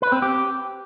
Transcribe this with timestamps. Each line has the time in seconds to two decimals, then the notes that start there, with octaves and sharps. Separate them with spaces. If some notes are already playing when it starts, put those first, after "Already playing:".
0.02 B4
0.12 C4
0.22 G4